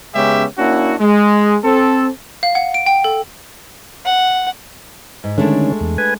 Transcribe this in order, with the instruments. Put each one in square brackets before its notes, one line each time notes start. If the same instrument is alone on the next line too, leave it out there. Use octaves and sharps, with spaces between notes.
[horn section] C#3 G#3 B3 C#4 G4 E5
A#3 C#4 D4 E4 F#4
G#3
C4 A4
[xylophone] F5
F#5
D7
G5
A4
[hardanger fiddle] F#5
[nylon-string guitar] G#2
[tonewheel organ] D3 D#3 C#4 [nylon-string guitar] G#3 A3 D4
[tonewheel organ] E2
B4 G#5